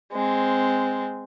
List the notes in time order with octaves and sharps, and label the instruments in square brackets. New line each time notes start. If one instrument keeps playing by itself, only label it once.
[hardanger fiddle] G#3 C4